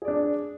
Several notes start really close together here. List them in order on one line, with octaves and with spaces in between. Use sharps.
G#4 D5 D4